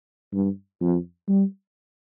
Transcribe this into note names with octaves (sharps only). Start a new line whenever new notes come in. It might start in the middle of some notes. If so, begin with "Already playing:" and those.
G2
F2
G3